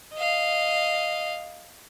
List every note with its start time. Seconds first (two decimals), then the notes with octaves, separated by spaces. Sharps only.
0.14 D#5 F5